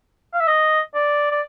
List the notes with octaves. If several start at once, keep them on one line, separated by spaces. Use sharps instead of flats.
F5
E5
D#5
D5
D5